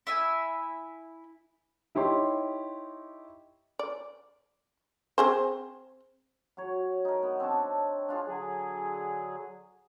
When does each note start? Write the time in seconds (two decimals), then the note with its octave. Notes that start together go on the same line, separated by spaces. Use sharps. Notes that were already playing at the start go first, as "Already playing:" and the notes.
0.07 E4 E5 G#5
1.95 D#4 E4 G4 C#5 C6
3.79 D5
5.18 C4 G#4 C5
6.57 F#3 C#5
7.05 D#4 A#4
7.23 B3
7.40 C4 D4 C#5 A5
8.09 D4 F4 G#4
8.26 D3 F#3 G#4